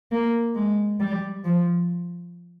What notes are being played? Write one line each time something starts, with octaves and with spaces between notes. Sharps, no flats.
A#3
G#3
G3
F3